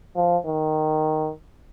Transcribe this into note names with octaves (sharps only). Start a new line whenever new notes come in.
F3
D#3